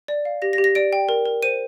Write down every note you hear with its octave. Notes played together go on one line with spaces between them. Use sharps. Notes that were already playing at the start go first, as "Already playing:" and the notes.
D5
F5
G4 A#6
A#6
G4
A#6
D5 D7
G5
A#4
A#4
C5 D#7